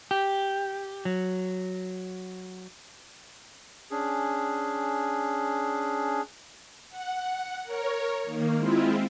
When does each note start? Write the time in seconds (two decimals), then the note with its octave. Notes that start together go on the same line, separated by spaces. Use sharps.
0.11 G4
1.05 F#3
3.91 C#4 D4 G#4
6.89 F#5
7.63 A#4 C#5
8.24 D#3 A#3
8.56 G#3 C4 E4 F4